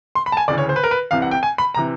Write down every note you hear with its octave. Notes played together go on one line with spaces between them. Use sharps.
C6
B5
A5
G#5
D2 C#3 E3 D5
C#5
C5
B4
A#4
B4
C2 C3 E3 F5
F#5
G5
G#5
B5
C3 E3 A#5